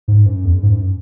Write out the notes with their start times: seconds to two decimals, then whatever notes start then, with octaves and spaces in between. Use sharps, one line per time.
0.08 G#2
0.26 F#2
0.45 E2
0.54 F#2
0.63 G#2
0.72 F#2